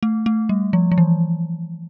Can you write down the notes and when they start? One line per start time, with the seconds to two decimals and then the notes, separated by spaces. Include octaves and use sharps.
0.03 A3
0.26 A3
0.49 G3
0.73 F3
0.92 F3
0.98 E3